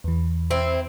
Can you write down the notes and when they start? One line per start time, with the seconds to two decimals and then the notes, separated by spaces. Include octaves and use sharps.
0.04 E2 E3
0.51 C4 E4